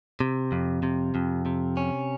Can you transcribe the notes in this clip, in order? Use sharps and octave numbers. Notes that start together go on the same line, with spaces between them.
C3
F2
C3
F2
C3
C#4